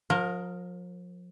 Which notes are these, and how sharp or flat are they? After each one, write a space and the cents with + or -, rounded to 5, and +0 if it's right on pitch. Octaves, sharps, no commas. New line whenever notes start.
F3 +40 A#4 +0